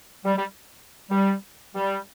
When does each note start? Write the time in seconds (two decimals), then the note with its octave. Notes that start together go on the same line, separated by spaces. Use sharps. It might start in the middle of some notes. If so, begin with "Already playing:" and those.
0.25 G3
0.36 G3
1.10 G3
1.75 G3